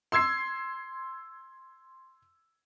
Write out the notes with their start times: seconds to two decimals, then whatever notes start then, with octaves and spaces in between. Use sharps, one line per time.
0.12 C6 E6 G#6 C7